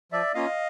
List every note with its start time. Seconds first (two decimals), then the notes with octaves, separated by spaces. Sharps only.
0.12 F3 D5 E5
0.34 A#3 C#4 F4 D#5 F5